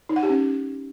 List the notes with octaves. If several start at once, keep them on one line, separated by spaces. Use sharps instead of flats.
D#4
F#5
G4
C#4